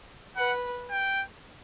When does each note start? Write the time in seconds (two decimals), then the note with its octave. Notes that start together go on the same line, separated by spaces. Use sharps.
0.36 B4 F#5
0.91 G5